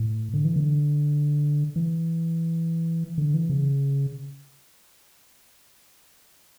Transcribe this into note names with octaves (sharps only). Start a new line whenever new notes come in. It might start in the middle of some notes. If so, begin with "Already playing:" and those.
Already playing: A2
D3
E3
D3
E3
D3
E3
C#3